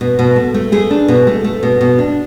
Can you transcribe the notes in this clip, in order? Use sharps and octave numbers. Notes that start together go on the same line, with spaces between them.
B2
B2
A3
A3
A3 G#4
D4
B2
A3
A3
B2
B2
D4